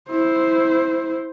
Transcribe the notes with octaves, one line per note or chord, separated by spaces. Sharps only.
E4 C5